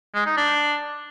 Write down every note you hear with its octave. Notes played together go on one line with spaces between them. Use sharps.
G#3
D#4
D4